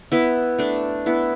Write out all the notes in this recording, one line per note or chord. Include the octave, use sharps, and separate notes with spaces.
B3 E4
A3 D4
B3 E4